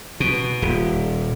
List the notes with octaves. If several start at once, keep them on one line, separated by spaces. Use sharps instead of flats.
B2
D#1